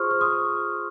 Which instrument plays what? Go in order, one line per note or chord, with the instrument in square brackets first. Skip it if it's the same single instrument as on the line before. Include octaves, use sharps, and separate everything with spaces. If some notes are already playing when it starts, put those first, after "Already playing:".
Already playing: [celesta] F4 G#4 C5 C6 C#6 D#6 F6
F6
C6 D#6